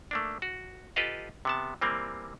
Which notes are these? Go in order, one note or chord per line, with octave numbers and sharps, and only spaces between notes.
A3 A#3 D4
F#4
F4 G4 A4 B4 D#5 F5
C3 B3 A5
E3 G3 A#3 C4